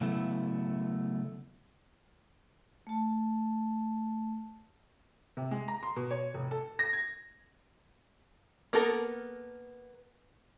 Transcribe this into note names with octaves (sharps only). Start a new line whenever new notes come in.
C#3 F#3 A3 B3 E4
A3 A5
C3
G#3
A#5
C6
B2
C#5
F1
A4
A#6
G#6
A#3 B3 A4 A#4